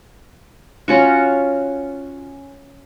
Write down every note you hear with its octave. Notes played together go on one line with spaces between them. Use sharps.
C#4 F4 F#4